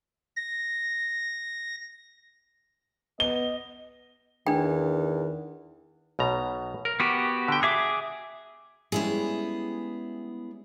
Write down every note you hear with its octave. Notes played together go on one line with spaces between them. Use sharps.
A#6
B3 D#5 G7
E2 D#3 D4 G5
B1 B2 A#5
A#4
B3 F#4 G4
D3 G5
F#4 G#4 E5 D6
G3 G#3 B3 C#4 E4 G#4